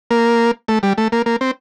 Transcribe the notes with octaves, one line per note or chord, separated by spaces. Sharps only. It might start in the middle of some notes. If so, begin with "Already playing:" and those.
A#3
A3
G3
A3
A#3
A#3
C4